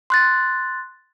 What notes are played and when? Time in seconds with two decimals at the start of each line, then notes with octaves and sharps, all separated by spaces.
0.10 C6 F#6 A6